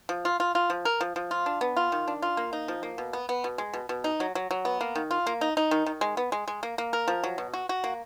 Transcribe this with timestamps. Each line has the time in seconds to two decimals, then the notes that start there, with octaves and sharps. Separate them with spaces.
0.09 F3
0.25 F4
0.40 F4
0.55 F4
0.70 F3
0.85 A#4
1.01 F3
1.16 F3
1.31 F4
1.46 D4
1.61 B3
1.77 F4
1.92 D#3
2.08 D4
2.22 F4
2.37 A#3
2.53 D#4
2.68 F3
2.83 A#3
2.98 B2
3.13 B3
3.29 B3
3.44 B2
3.58 G#3
3.74 B2
3.89 B2
4.04 D#4
4.20 F#3
4.35 F#3
4.51 F#3
4.65 B3
4.81 A#3
4.95 D#3
5.11 F4
5.27 A#3
5.41 D#4
5.57 D#4
5.71 D#3
5.86 D#3
6.01 G#3
6.17 B3
6.32 G#3
6.48 G#3
6.63 A#3
6.78 A#3
6.93 A#4
7.08 F3
7.24 F#3
7.38 B2
7.54 F#4
7.69 F#4
7.84 A#3